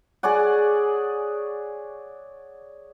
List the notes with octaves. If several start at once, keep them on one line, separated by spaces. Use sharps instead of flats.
G#4 C#5 D5 F#5